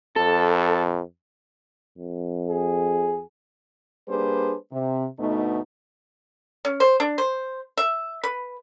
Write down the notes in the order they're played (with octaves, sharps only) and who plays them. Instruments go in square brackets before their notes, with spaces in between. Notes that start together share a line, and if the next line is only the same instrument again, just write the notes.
[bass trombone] F2 [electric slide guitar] A4
[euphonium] F2
[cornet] G#4
[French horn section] G3 A#3 D4 G#4 B4 C5
C3
D2 B2 A3 B3 D#4
[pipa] C#4
C5
D4
C5
E5
B4